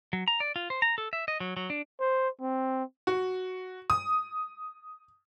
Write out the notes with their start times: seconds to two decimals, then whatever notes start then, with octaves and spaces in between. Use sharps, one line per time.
0.13 F#3
0.28 A#5
0.40 D5
0.56 F4
0.70 C5
0.82 A#5
0.98 A4
1.13 E5
1.28 D#5
1.40 F#3
1.57 F#3
1.70 D4
2.00 C5
2.41 C4
3.07 F#4
3.90 D#6